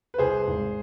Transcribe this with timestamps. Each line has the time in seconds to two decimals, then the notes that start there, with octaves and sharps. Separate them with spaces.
0.14 B4
0.18 C2 G#4 C5
0.48 G#1